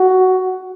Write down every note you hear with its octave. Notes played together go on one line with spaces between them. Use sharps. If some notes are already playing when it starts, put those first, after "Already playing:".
Already playing: F#4